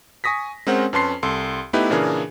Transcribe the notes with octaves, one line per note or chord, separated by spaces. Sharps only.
G#5 C#6 D#6 A#6 B6
G#3 C4 C#4 A#4 C5 F#5
F2 C#4 B4 A5 C6 C7
C2 A4 C6
A3 B3 D#4 E4 G4 B4
A#2 C#3 E3 D4 G#4 A#4